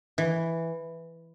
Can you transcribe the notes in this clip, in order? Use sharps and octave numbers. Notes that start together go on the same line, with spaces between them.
E3